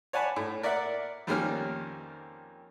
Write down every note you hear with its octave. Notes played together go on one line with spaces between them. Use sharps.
C#5 D5 F#5 G#5 A5 B5
A2
A#4 D5 E5 F#5
F2 D#3 G3 A#3 C#4 F6